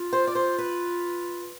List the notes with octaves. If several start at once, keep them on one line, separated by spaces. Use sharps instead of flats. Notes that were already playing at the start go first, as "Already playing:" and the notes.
Already playing: F4
C5
D5
C5
B4